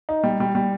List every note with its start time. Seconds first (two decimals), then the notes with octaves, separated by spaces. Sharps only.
0.09 D#4
0.24 G3
0.40 G3
0.55 G3